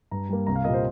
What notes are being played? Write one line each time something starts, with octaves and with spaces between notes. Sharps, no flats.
G2 A#5
G3 A#3
C2 A#5
F5
A#2 G3 A#3 D#5
C5